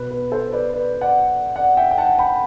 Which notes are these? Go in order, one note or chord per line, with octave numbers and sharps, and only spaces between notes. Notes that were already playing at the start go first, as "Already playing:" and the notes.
Already playing: B2 B4
B4
A4 C5
B4 D5
B4 D5
D5 F#5
D5 F#5
E5 G5
G5
F#5 A5
G5 B5